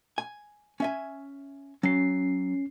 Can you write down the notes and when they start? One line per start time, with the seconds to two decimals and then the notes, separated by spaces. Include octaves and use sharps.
0.18 G#5
0.80 C#4 E5 G#5
1.83 F#3 C#4 C7